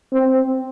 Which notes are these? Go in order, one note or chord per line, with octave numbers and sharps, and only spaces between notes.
C4